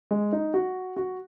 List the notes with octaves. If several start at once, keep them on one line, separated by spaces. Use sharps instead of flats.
G#3
D#4
F#4
F#4